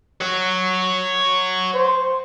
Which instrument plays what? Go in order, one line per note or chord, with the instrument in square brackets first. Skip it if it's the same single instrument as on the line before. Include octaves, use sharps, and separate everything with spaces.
[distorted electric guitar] C#5 F#5
[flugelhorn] C5